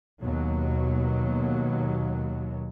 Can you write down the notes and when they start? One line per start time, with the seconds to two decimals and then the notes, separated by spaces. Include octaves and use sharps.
0.21 D#2 B2 F#3